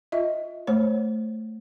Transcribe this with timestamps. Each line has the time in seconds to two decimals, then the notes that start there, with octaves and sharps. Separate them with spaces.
0.12 F4 D#5 E5
0.67 A3 C5 C#5